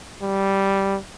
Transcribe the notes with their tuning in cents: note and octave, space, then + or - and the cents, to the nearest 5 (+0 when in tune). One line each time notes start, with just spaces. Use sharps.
G3 -5